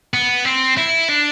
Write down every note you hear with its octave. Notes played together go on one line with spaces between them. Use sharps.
B3
C4
E4
D4